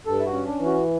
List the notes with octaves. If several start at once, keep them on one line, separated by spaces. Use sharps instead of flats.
G2 A4
E4
F#4
C#4
D4
E3
F#4